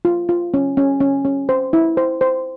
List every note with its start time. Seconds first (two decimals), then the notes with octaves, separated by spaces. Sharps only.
0.05 F4
0.29 F4
0.54 C#4
0.77 C#4
1.00 C#4
1.25 C#4
1.49 C5
1.73 E4
1.97 C5
2.21 C5